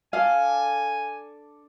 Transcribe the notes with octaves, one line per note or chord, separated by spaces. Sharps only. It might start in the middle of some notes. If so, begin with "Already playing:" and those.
D4 A4 F5 G#5